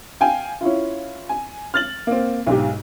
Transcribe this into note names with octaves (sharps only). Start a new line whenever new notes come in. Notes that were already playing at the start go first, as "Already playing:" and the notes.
F5 G5 G#5
C#4 E4 F4
G#5
F6 A6 F#7
A#3 C4
B1 G#2 G4